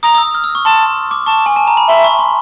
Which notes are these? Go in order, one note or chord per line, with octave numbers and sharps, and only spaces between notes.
A#5 D#6
D#6
E6
F6
E6
C#6
A5 C6
D6
A5 C#6
G#5
A5
A#5
B5
E5 C6
C#6
C6